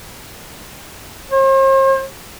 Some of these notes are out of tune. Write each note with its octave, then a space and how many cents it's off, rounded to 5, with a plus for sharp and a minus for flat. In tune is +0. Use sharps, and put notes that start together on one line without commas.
C5 +45